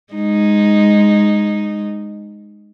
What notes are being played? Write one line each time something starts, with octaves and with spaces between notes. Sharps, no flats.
G#3 D#4